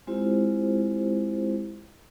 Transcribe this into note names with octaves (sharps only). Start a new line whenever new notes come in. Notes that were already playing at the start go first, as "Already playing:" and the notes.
G#3 C4 E4 F4 G4 C5